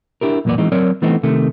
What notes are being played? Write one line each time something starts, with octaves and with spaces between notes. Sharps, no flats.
D4 E4 G4 A#4
B1 E2 A#2 A#3 B3 D5
E3 G#3 C4 D#4
F#3 C4 A#4 C#5 D5
E3 A3 B3 C4 D#4
C3 D#3 A3